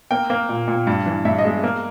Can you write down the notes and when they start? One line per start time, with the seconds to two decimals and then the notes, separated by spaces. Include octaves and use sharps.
0.11 A#3 G5
0.30 A#3
0.49 A#2
0.68 A#2
0.87 G2
1.06 E3
1.25 G2 E5
1.38 D#5
1.45 G#3
1.64 A#3